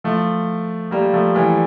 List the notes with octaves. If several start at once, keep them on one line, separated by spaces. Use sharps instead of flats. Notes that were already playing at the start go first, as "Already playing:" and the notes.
F3 A3
G3 A#3
F3 A3
E3 G3